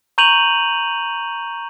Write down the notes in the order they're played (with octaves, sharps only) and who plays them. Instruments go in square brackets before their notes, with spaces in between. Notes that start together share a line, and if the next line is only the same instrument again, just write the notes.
[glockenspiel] A#5 C#6 G6 D#7 F7 F#7